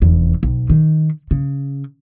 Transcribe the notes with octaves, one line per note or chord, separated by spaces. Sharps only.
F1 E2
B1
D#3
C#3